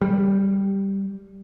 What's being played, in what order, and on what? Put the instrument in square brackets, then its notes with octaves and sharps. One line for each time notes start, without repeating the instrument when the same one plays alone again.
[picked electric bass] G3